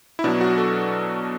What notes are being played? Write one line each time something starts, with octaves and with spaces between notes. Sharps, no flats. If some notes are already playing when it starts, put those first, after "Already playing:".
E4
B2 F#3 D4
F#4
A4